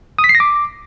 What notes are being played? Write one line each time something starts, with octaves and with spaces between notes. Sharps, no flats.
D#6
B6
C7
A#6
D6